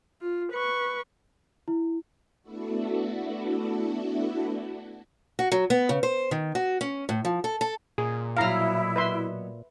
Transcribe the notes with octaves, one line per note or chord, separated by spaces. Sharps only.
F4
B4 C#6
E4
A3 B3 D4 E4 F#4 A4
F#4
F#3
B3
C#3
C5
D#3
F#4
C#4
A2
F3
A4
A4
A#2 G#4
B2 F#3 E4 F5 A#5
B4 E5 C6